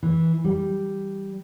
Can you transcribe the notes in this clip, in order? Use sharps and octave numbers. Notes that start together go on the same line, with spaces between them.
E3
G3